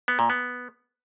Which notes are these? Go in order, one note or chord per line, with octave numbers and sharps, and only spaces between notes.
B3
A#2
B3